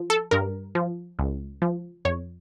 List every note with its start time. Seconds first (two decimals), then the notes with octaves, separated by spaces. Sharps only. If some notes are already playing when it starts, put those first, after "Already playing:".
Already playing: F3
0.10 A4
0.31 G2 A#4
0.75 F3
1.19 C#2
1.62 F3
2.05 F2 C#5